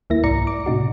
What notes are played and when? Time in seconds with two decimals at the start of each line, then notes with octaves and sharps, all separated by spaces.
0.10 D#2 A#3 E4 A#6
0.24 C2 G#2 D5 A#5 C#7
0.47 D6
0.66 A2 C3 D#4 F#4